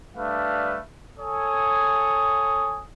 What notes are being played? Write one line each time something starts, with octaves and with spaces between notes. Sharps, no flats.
G3 A3 D4 B4 F5
A4 C#5 G#5 D#6